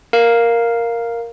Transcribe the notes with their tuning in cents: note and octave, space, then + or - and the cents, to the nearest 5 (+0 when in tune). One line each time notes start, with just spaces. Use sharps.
A#4 +0 F5 +0